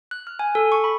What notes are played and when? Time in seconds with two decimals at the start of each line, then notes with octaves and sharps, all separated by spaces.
0.11 F#6
0.27 F6
0.39 G#5
0.55 A4
0.72 C#6
0.84 B5